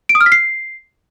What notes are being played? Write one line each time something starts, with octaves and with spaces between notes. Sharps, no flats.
D7
D#6
F6
B6
C7